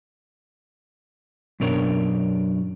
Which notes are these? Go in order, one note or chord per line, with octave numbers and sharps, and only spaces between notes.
F#2 B2 D4 A#4 C#5